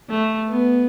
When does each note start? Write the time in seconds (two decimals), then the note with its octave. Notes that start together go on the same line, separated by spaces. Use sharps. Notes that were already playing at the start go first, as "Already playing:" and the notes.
0.09 A3
0.49 B3